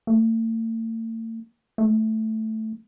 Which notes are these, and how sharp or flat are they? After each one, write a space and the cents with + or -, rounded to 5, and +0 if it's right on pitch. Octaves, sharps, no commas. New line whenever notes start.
A3 +45
A3 +0